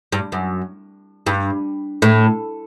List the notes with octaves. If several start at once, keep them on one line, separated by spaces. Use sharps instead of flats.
G2
F#2
G2
A2